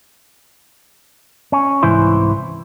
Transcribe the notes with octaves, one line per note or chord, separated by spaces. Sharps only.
C#4
C2 G#2 E3 E4 C5